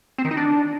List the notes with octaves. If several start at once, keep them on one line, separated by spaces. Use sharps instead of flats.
C4
D#3
D#4
D4